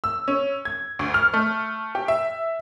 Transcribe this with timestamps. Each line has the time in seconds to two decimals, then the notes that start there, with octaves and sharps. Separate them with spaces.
0.04 E6
0.28 C#4
0.65 G#6
0.99 D2
1.14 F6
1.34 A3
1.95 G4
2.08 E5